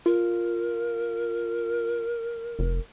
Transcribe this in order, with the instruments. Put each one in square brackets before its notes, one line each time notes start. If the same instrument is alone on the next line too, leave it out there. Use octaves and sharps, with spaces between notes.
[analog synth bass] F4 [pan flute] A#4
[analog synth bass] F1